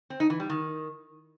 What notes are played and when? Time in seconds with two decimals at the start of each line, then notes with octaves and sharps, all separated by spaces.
0.10 C4
0.20 D#4
0.30 E3
0.40 G3
0.50 D#3